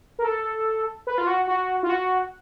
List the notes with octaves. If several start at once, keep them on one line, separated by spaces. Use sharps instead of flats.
A#4
A4
B4
F4
F#4
F#4
F4
F#4